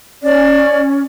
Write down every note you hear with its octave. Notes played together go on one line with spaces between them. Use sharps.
C#4 D5